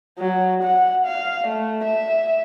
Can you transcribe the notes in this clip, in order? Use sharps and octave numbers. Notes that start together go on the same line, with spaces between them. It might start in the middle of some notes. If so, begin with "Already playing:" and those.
F#3
F#5
F5
A3
E5